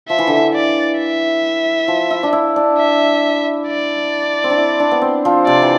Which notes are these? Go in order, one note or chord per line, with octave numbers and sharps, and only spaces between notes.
F3 E5
E3
D3
E3
D5
E5
F3
E4
D4
E4
D4
E5
D5
C4
D4
E4
D4
B3
C4
F3
C3 D5
E3